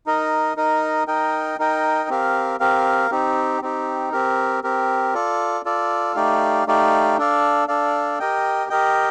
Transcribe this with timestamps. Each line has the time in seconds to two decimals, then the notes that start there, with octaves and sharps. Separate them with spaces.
0.06 D#4 A#4 D#5
0.57 D#4 A#4 D#5
1.07 D#4 A#4 D#5 G5
1.59 D#4 A#4 D#5 G5
2.09 C4 G4 A#4 F5
2.60 C4 G4 A#4 F5
3.11 C4 D#4 G4
3.62 C4 D#4 G4
4.12 C4 G4 A#4
4.64 C4 G4 A#4
5.14 F4 A4 D5
5.65 F4 A4 D5
6.15 A3 D#4 G4 D5 F5
6.67 A3 D#4 G4 D5 F5
7.18 D4 A4 D5 F5
7.68 D4 A4 D5 F5
8.19 G4 A#4 D#5 G5
8.69 G4 A#4 D#5 G5